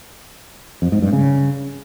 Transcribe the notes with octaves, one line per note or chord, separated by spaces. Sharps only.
F2
G#2
G2
C#3